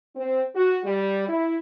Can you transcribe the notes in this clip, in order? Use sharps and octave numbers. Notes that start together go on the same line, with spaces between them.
C4
F#4
G3
E4